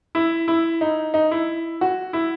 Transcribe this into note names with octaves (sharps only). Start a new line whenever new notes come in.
E4
E4
D#4
D#4
E4
F#4
E4